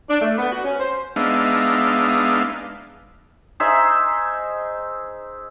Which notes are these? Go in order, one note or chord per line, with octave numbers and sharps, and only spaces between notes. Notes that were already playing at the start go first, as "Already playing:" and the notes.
D4
A3
B3
F#4
C#4
C5
G#3 B3 D4 D#4 E5 F5
D#4 G#4 C5 E5